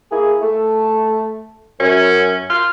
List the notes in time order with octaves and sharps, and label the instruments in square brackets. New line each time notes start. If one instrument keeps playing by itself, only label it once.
[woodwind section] A#3 E4 G#4
A3
[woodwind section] F#2 [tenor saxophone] C#4
[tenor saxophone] F4